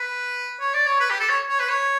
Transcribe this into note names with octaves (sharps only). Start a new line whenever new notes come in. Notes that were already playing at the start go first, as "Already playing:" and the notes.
Already playing: B4
C#5
D5
C#5
B4
G4
A4
C#5
C#5
B4
C#5